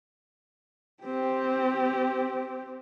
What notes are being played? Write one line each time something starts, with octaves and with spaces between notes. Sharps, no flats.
C4 G4